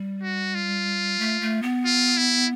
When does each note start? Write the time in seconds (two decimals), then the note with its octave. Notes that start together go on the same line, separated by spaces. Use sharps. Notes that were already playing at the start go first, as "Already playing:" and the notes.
Already playing: G3
0.23 F#4
0.55 F4
1.19 A3
1.41 A3
1.62 B3
1.85 F4
2.17 E4